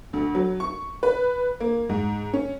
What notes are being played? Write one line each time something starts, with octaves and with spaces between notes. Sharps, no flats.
D2
F#3
C#6
B4
A#3
G#2
C#4